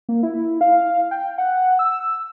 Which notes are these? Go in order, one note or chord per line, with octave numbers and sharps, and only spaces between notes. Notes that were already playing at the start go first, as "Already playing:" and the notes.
A#3
E4
F5
G5
F#5
E6